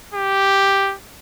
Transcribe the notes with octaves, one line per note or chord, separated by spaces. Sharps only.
G4